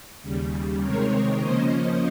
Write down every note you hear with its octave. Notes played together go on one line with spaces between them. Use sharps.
D#2 C#3 G3
C3 D#3 G#3 C4 A#4 C#5
C#3 F3 A#3 C#4 C5 D#5
C5 D#5